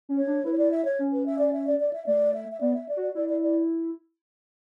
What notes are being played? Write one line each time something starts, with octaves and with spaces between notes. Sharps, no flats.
C#4
C#5
D4
E4 B4
C#5
D5
E5
C#5
C#4
B4
E5
D5
E5
D5
D5
E5
A3 D5
E5
E5
B3 D5
E5
D5
F#4
D5
E4 D5
D5
D5